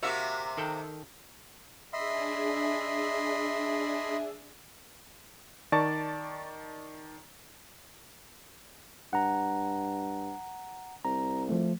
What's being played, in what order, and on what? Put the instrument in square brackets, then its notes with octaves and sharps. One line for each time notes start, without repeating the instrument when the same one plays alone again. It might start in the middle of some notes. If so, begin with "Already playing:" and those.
[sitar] C3 A#3 E5 [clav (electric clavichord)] F#4 F5
[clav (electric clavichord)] D#3 A4 G5
[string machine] D4 G#4 [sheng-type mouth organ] D#5 B5 C6 [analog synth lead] E5
[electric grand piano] D#3 D5 A5 C#6 A6
[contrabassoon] G2 [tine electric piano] F#5 A#5
[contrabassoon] C2 [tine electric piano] A#5
[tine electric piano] F3 A3